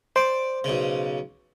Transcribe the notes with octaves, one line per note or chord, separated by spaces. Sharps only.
C5 D5
B1 C#3